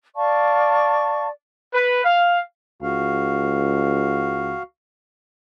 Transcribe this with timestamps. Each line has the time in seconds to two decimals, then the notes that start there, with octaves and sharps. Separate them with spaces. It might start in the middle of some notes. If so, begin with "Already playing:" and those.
0.15 D5 F5 A5 C#6
1.73 B4
2.03 F5
2.82 C#2 F#4 F5